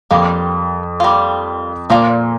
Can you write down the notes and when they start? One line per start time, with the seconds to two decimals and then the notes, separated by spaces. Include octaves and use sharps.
0.11 F2 G3 A#3 F4
1.00 G3 A#3 F4
1.90 A#2 F3 A#3 F4 D5